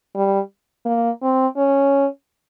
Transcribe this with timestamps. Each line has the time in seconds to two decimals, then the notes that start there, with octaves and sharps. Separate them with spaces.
0.15 G3
0.86 A#3
1.22 C4
1.57 C#4